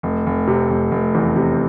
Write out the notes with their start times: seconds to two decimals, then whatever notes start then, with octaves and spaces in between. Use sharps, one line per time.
0.03 F1
0.26 F1
0.47 C3
0.70 F1
0.92 F1
1.14 E2
1.36 C3